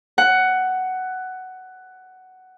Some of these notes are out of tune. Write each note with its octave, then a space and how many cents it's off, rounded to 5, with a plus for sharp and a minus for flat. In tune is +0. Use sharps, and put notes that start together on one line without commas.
F#5 +10